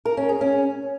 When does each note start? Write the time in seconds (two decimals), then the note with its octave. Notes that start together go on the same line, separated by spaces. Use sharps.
0.05 A#4
0.17 C#4
0.29 G#4
0.41 C#4